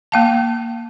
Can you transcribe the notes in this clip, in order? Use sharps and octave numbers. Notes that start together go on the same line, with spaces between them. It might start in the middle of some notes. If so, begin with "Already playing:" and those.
A#3 F5 A5